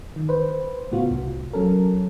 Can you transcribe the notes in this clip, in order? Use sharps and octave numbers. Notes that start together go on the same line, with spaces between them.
D#3
B4 C5
A2 C#3 B3 F4 F#4
C2
F#3 C#4 A4 A#4